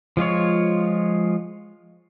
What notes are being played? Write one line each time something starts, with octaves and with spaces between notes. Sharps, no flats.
F3 G#3 F4 C#5